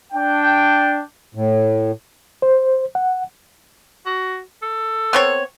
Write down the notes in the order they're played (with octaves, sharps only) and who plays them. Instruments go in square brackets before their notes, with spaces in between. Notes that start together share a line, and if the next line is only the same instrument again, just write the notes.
[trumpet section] D4 G5
[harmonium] A2
[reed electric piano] C5
F#5
[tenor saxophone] F#4
A4
[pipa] B3 C4 C#5